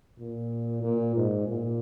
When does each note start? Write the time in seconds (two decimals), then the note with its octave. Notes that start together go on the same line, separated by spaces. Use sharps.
0.19 A#2
0.83 A#2
1.16 G#2
1.47 A#2